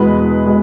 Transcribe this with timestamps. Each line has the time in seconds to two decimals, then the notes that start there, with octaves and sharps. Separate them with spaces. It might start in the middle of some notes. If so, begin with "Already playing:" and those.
Already playing: E2 B2 G#3 B3 B4
0.45 B2 G#3